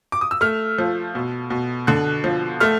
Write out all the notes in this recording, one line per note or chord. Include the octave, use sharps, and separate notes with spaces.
D6
D#6
E6
A3 F6
F3
B2
B2
D3 F#6
F3
A3 F6